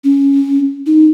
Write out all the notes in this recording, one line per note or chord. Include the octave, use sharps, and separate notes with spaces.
C#4
D#4